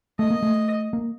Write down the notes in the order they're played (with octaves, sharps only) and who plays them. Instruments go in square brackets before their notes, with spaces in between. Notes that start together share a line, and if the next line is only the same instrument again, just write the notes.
[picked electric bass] A3 [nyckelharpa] D#5
[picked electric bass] A#3
A3
A#3